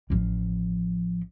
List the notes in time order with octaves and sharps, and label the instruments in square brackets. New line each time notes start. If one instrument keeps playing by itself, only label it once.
[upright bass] A1 F3